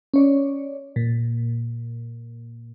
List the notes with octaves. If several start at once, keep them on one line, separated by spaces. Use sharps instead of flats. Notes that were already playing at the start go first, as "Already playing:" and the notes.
C#4 C#5 D5
A#2